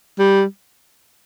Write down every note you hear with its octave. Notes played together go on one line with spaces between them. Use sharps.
G3